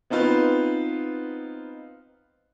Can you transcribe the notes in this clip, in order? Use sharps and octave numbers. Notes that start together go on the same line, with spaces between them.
B3 C4 D#4 F4 B4